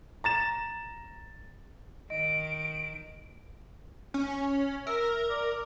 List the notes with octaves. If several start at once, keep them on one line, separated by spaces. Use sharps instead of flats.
A#5 A6 E7
D#3 D#5 D7
C#4
A#4 E5
D5